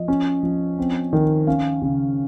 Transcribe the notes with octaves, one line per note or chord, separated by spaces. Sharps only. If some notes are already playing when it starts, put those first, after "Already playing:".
Already playing: F3 D#5
C#4
F3
C4
D#3
C#4 F5
C#3